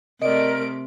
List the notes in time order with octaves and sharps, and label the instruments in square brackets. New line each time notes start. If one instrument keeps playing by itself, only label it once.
[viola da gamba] C3 [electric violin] A3 D7 [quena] A#4 [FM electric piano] D5 D#5